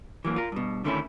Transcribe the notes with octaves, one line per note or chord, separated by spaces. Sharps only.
E3 F#3 A#3
F4 A#4
G2 B2
D3 D#3 A3 C4 C#4 E4